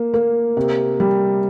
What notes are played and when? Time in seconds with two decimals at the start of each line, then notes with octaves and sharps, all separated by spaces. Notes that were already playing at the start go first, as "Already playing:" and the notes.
Already playing: A#3
0.14 A#3
0.57 C3
1.00 G3